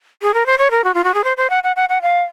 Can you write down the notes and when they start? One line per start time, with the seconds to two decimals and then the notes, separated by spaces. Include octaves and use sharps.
0.22 G#4
0.34 A#4
0.46 C5
0.58 C#5
0.71 A#4
0.84 F#4
0.94 F4
1.04 F#4
1.14 G#4
1.24 C5
1.37 C5
1.50 F#5
1.63 F#5
1.76 F#5
1.89 F#5
2.02 F5